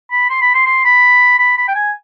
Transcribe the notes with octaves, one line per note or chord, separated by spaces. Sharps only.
B5
C6
B5
C6
C6
B5
B5
B5
G5
G#5